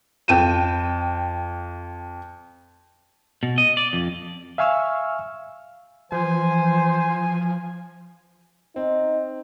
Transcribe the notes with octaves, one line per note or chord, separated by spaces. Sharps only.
F2 G5 D#7 E7
B2
D#5
D5
F2
E5 F5 G#5 C#6 E6 F6
E3 F3 C5 G#5
C4 D#4